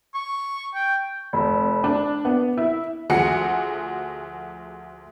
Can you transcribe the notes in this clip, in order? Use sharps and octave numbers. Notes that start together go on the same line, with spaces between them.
C#6
G5
F1
D4
B3
E4
D2 F3 F#4 G#4 C#7